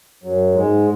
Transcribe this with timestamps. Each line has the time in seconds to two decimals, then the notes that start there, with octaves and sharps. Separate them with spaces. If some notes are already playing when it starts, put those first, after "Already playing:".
0.24 F#2 F#3
0.54 G#2 G#3